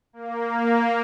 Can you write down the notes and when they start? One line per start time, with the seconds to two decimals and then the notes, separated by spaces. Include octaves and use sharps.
0.13 A#3
0.58 A#3